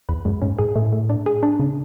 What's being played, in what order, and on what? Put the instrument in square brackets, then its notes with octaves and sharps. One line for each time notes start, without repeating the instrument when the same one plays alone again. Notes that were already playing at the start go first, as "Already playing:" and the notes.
[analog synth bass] E2 [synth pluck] B4
[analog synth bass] F#2 [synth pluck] G#3
[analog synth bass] G#2 [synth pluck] C#4
[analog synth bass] G#2 [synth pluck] G#4
[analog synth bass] A2 [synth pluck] A3
[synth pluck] A3
D4
G#4
D4
C#3